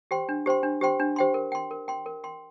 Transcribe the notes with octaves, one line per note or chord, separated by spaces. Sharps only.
G4 C5 G5 C6
D4
G4 C5 G5 C6
D4
G4 C5 G5 C6
D4
G4 C5 G5 C6
A#4
G5 C6
A#4
G5 C6
A#4
G5 C6